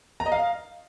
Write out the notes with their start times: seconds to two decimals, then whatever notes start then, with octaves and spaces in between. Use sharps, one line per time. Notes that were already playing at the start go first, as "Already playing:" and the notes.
0.20 A#5
0.26 D#5
0.32 F5